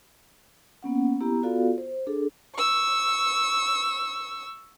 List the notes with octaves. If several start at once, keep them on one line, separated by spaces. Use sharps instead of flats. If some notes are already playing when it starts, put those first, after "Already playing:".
A#3 B3 C#4 F#5
B3 E4 G4 A#5
B3 F4 F#4 A4 D5 F5
C5
D4 G#4 A4
C#6 E6